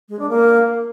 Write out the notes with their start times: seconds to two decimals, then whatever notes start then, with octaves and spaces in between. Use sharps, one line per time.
0.09 G#3
0.19 D4
0.30 A#3